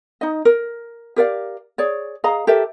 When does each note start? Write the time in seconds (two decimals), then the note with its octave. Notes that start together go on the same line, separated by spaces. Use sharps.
0.21 D#4 D#5
0.45 A#4
1.16 G4 A#4 D5 F5
1.78 G#4 C#5 D5
2.24 G#4 D#5 F5 A#5
2.47 G4 A4 A#4 E5